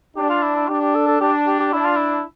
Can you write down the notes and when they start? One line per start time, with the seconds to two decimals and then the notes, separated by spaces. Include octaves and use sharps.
0.16 D4 G4
0.29 F4
0.43 E4
0.56 E4
0.68 D4 G4
0.82 G4
0.95 A4
1.08 A4
1.21 D4 G4
1.47 G4
1.60 G4
1.73 D4 E4
1.85 F4
1.96 E4